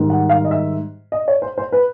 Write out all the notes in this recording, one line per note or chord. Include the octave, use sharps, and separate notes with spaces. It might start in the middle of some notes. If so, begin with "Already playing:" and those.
Already playing: G#2 D#3 G3
F#5
F5
D#5
E5
D#5
C#5
C5
C5
B4